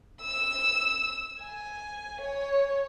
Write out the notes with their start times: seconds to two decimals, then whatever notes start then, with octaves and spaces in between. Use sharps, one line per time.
0.21 E6
1.41 G#5
2.21 C#5